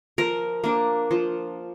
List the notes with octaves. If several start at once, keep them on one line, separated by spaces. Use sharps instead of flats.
F3 A#4
A#3 D4
F3